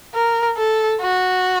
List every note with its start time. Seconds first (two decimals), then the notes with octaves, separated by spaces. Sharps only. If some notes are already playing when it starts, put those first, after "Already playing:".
0.14 A#4
0.57 A4
1.01 F#4